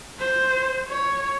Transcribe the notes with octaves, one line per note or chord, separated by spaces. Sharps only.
C5
C#5